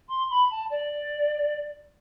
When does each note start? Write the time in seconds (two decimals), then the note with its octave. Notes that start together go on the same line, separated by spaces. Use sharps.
0.08 C6
0.30 B5
0.50 A5
0.70 D5